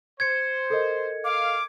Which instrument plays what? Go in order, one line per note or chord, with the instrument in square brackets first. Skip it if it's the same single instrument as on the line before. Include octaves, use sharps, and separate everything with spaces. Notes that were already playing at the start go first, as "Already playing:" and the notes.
[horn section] C5 [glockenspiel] G#6 C#7
[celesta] A4 A#4 D#5
[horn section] F5 [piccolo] D6